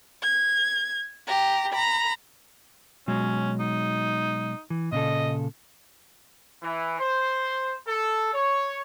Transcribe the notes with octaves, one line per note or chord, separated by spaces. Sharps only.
G#6
G4 A#5
A#5 B5
B2 F#3 G#3 C#4
D#4
E3
A#2 C#3 A4 D#5
E3
C5
A4
C#5